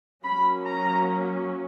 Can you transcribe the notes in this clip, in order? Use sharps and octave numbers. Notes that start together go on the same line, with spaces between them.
F#3 A#3 C#4 B5
A#5